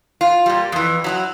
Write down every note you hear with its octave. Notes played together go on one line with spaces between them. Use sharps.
F4
A#2 G3
F2 E3
F#3 D#4 E4